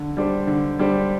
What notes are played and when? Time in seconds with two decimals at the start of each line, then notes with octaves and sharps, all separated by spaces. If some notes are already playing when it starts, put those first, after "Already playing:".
Already playing: D3
0.17 G3 D4 G4 C5
0.47 D3
0.79 G3 D4 G4 C5